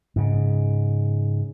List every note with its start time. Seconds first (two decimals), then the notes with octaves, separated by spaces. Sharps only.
0.16 G#2 C#3